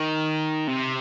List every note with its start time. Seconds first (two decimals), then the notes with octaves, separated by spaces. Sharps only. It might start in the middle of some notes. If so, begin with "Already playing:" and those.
Already playing: D#3
0.67 C3